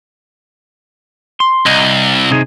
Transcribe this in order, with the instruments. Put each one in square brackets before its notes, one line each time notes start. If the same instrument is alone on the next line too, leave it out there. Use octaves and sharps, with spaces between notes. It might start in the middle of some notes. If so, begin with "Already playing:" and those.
[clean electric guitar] C6
[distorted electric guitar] C2 [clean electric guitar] D#5
[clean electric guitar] C3 D#4 G#4